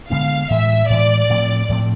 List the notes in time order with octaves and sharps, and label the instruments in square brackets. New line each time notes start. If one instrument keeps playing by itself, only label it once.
[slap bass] D3 G#3 B3 D4 [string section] F5
[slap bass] A2 E3 G#3 [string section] E5
[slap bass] A2 E3 G#3 [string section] D5
[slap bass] A2 F3 A3 C4
A2 F3 A3 C4